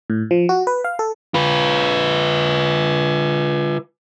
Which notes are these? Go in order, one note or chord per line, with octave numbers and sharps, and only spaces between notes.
A2
F3
F#4
B4
F5
A4
F4 B4